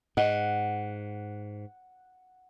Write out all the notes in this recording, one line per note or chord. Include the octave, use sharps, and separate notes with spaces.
G#2 D#5 F#5